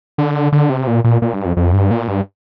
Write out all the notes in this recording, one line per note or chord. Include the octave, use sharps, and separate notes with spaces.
D3
D3
C3
A#2
A#2
A#2
G2
F2
F2
G2
A#2
G2